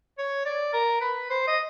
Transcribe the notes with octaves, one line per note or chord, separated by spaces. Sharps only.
C#5
D5
A#4
B4
C5
D#5